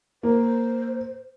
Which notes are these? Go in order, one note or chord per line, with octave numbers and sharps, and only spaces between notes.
A#3 C5